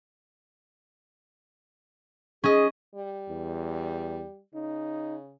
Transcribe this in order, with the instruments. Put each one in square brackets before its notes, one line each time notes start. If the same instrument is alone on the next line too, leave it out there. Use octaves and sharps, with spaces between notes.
[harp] C#4 D#5 [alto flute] G#4
[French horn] G3
[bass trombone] E2
[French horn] C#3 [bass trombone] D#4